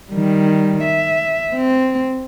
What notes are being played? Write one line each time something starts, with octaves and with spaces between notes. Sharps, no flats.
D#3 G3
E5
C4